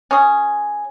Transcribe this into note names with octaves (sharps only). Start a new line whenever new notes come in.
C#4 G#4